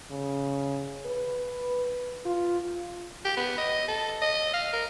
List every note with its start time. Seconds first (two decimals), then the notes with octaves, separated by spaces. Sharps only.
0.11 C#3
1.06 B4
2.25 F4
3.25 G4
3.36 B3
3.58 D#5
3.88 A4
4.21 D#5
4.53 F5
4.73 A#4